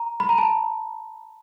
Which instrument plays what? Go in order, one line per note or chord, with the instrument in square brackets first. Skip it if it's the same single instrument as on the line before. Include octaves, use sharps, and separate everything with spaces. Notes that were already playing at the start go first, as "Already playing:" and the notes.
Already playing: [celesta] A#5
B5
A#5
A5